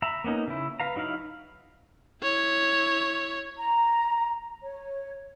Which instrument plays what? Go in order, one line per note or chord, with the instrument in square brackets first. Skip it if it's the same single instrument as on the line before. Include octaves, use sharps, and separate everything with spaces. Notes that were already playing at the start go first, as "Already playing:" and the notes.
[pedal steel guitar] E5 A#5 B5
A#3 B3 C#4 D#4
C#3 E4
B4 F5 A#5
F#3 D#4 E4 F5 B5
[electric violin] E4 C#5
[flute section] A#5
C#5